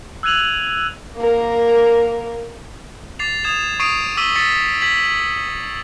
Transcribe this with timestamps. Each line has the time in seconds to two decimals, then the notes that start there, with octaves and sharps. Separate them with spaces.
0.23 E6 F#6 G#6 D#7 F7 F#7
1.17 A#3 A#4
3.19 D6 A6 C7 F7
3.44 D#6 G#6 E7 F7
3.80 C#6 D#6 C7 D7 D#7 F7
4.17 D6 E6 B6 D#7 G7
4.35 C#6 A6 B6 C#7
4.82 G#6 B6 F#7